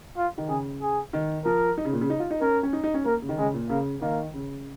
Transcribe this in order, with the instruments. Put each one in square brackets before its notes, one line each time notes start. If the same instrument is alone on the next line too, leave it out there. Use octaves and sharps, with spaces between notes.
[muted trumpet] F4
[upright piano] D#3
[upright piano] C#3 [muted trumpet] G#4
[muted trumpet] G#4
[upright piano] D#3
[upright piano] F3 [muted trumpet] A#4
[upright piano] D#4
C#3
A#2
C#3
D#4
F4
D#4
[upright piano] C#4 [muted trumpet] A#4
[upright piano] C#4
D#4
D#4
C#4
[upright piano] A#3 [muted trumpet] A#4
[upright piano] C#3
D#3
[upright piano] C#3 [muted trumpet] G#3
[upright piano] A#2
[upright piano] C#3 [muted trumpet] A#3
[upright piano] D#3 [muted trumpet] A#3
[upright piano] C#3